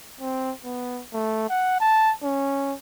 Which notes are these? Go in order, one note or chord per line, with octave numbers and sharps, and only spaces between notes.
C4
B3
A3
F#5
A5
C#4